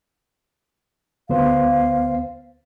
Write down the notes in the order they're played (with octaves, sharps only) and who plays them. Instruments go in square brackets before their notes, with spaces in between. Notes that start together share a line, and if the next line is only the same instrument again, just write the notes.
[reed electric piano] D2 B3 C5 [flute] F5